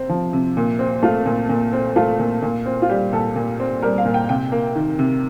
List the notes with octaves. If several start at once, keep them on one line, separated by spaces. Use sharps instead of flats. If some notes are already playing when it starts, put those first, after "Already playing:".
Already playing: C3 C4
F3
C3
A#2
C4
A3 F4
A#2
A#2
C4
A3 F4
A#2
A#2
C4
F4
G3 G4
A#2 A4
A#2
C4
G3 A#4
F5
A#2
G5
C3 G5
A#3
D#3
C3